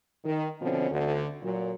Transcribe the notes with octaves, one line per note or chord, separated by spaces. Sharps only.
D#3
B2 D3 F3 C4 C#4
D2 D3
A#2 F#3